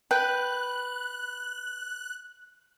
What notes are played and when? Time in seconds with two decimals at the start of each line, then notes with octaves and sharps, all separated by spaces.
0.11 B4 G5 F#6